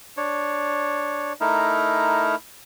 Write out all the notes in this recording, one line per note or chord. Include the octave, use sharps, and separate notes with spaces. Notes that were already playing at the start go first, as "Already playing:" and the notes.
D4 C#5
A3 D#4 E4 A#4